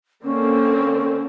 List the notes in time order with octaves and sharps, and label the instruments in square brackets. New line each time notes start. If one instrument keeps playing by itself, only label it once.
[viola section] D3 A#3 C4 [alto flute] C#4